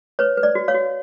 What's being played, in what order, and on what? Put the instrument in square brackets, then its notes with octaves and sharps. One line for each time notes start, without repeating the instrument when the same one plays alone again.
[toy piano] B4 C#5
B4
D5
F#4
C#5 F5
F#4